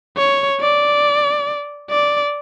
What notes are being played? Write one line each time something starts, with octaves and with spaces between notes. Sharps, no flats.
C#5
D5
D5